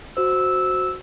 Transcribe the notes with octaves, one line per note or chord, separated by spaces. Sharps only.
F#4 C5 E6